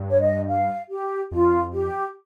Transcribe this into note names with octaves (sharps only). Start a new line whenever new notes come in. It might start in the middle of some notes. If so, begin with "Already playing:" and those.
Already playing: G2
C#5
D#5
F5
G4
F2 F4
G4